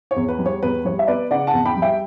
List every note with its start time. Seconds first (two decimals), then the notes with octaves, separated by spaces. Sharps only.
0.11 C#5
0.16 E2
0.28 B4
0.39 G3
0.46 C#5
0.63 E2 B4
0.85 G3 C#5
0.99 E5
1.07 B3 B4 D5
1.30 C#3 D5 F#5
1.47 F#5 A5
1.53 E2
1.66 G5 B5
1.77 G3
1.82 E5 G5